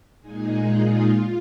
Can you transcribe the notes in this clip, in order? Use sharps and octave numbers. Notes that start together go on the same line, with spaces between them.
A#2 G#3 D#4 G#4
F4
F4